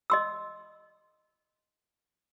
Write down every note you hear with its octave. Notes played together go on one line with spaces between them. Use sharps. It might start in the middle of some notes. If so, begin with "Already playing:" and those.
D#5 C6 E6